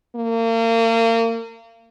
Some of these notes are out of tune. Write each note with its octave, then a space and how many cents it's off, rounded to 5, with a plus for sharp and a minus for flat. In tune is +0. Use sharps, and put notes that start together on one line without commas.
A#3 -35